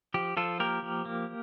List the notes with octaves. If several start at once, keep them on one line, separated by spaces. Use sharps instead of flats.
F3 G4
F3 F4 A4
A#3 G4 A#4
F3
A#3